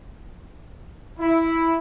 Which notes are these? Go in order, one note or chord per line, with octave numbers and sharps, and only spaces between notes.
E4